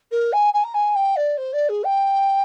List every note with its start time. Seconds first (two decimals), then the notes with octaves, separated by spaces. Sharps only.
0.11 A#4
0.32 G#5
0.53 G#5
0.63 A#5
0.74 G#5
0.95 G5
1.16 D5
1.37 C5
1.52 D5
1.68 G#4
1.83 G5